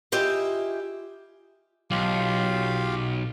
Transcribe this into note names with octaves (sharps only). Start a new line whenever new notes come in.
E4 F4 G4 G#4 D#5 E5
B1 F4 G4 F5